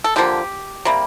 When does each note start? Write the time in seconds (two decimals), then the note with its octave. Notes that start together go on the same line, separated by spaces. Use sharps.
0.04 A4
0.16 D3 F3 A#3 G4
0.85 C3 G3 A#3